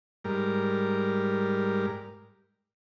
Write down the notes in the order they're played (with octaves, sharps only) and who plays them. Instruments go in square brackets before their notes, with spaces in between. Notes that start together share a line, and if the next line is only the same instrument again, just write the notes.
[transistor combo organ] G#2 G3 A#4